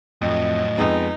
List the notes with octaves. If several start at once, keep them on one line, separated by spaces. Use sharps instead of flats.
F2 A2 F#3 D#5
F2 G#3 B3 D#4